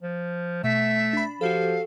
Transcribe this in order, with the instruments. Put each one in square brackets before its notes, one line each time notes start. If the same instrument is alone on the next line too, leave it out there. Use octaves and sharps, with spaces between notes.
[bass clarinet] F3
[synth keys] B2 [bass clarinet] A3 [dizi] E5
[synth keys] D4 B5
[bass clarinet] F3 [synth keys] F#4 G4 A4 [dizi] F5